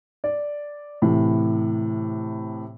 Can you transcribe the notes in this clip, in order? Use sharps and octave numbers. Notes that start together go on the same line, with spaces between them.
D5
A2 C3 E3